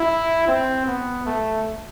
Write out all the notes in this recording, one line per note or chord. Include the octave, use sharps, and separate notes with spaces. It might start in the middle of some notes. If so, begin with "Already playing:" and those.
Already playing: E4
C4
B3
A3